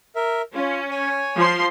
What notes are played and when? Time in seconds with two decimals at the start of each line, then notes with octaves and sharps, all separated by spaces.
0.15 A#4 E5
0.55 C#4 F4
0.91 C#5 G#5
1.37 F3 C6